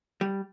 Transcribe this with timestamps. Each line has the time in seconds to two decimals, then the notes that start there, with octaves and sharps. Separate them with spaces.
0.21 G3